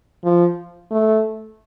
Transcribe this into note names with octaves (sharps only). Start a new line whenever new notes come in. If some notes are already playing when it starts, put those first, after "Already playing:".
F3
A3